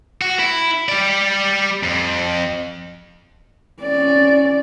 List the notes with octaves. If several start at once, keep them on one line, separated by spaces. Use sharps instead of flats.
F#4
E4
G3 D5
F2
C#4 D5